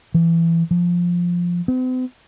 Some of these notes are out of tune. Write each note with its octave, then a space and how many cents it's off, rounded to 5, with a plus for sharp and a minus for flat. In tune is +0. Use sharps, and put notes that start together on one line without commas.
E3 +20
F3 +5
C4 -45